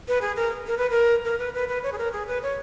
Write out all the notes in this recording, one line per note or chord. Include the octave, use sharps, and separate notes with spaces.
B4
G#4
A#4
A#4
B4
A#4
A#4
B4
B4
B4
C#5
G#4
A#4
G#4
B4
C#5